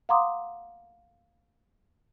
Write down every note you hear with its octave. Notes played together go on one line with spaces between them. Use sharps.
F5 F#5 A#5 C6 D6 D#6